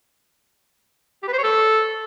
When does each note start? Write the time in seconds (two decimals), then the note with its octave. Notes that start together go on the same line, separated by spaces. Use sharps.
1.22 G4
1.28 B4
1.33 C5
1.38 C#5
1.43 A4